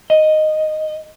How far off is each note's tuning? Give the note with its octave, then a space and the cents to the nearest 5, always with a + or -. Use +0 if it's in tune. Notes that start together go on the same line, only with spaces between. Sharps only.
D#5 -5